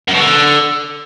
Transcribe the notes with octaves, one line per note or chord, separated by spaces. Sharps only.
F#2
B2
D3